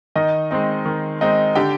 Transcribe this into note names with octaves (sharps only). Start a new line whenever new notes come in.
D#3 D#4 D#5
G#3 C4 D#4
D#3
G#3 C4 D#4
D3 G4 G5